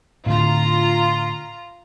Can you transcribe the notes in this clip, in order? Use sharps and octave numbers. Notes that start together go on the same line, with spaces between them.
A2 D3 F4 A#5